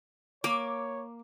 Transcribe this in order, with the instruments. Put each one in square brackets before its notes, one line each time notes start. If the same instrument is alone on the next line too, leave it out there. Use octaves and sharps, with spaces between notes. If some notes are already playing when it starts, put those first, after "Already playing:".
[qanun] A#3 [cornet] C#5 [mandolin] D6